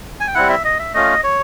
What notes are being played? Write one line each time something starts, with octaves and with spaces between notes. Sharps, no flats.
G#5
G5
G3 C4 E4 F#5
E5
D#5
E5
A3 C#4 F4 D#5
C#5